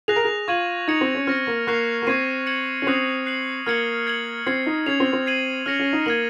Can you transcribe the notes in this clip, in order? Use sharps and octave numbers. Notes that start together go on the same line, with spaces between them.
G#4 F#6 A#6 F7
A#4
G#4
F4 C#6 G#6 D#7 F#7
D#4 G#6 C#7 F7
C4
C#4
C4 F6 A#6 C#7
A#3
A#3 C#6 F#6 C7 F7
A#3
C4 C#6 G#6 C7 D#7
G#6 C#7 F#7
C#4
C4 D#6 F#6 C7 F7
F#6 C7 F#7
A#3 F6 G#6 C#7 F#7
G#6 C#7 F#7
C4 G#6 C7 F#7
D#4
C#4 G#6 C7 F7
C4
C4
G#6 C7 D#7 F#7
C#4 F6 A#6 C#7 F7
C#4
D#4
A#3 G#6 D#7 F#7